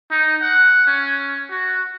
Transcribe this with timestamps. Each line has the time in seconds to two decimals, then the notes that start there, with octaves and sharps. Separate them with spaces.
0.11 D#4
0.42 F#5
0.87 C#4
1.51 F#4